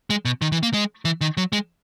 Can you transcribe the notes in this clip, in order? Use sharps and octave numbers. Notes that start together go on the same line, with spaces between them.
G#3
B2
D#3
E3
A#3
G#3
E3
D#3
F#3
G#3